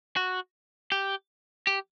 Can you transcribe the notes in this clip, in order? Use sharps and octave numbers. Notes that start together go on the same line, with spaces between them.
F#4
G4
G4